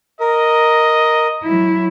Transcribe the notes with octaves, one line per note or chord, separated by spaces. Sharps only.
A#4 D#5
F#3 E4